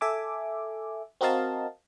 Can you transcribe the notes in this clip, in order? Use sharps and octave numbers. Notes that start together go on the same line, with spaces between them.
A4 E5 G#5 D6
C4 F#4 A#4 D#5 F5 A5